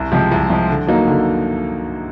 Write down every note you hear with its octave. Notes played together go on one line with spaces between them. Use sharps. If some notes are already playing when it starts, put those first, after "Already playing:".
Already playing: C2
C3 F3 G#3
C2
C3 F3 G#3
D3
F#3 A#3 D#4
D3